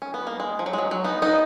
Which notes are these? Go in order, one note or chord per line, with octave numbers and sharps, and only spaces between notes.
C#4
B3
A#3
G#3
F3
F#3
G#3
F#3
F#3
B3 D#4
B3 D#4